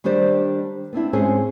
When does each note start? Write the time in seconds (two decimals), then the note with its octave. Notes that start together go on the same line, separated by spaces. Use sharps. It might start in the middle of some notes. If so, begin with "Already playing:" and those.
0.04 D#3 G3 D4 G4 C5 D5
0.93 B3 C4 D4 E4
1.13 G#2 C4 C#4 G#4 C5